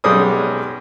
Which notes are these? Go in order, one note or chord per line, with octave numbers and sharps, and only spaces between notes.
B1 G3 G#3 C#4 D#6